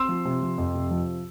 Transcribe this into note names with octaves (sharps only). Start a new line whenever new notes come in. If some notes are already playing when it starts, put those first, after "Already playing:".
Already playing: C4 C6 E6
F3
C3
F3
F2
C3
F3